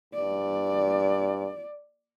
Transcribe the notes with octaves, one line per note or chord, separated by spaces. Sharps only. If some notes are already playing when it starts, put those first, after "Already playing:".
G2 D5